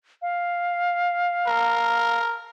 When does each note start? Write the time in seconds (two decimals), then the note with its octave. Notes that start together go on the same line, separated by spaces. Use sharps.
0.22 F5
1.47 A#4